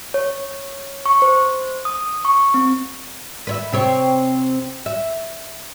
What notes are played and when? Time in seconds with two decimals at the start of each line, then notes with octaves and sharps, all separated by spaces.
0.14 C#5
1.06 C#6
1.22 C5
1.85 D#6
2.25 C#6
2.54 C4
3.47 B4 C#5 E5
3.72 C3 C4 C#5
4.86 E5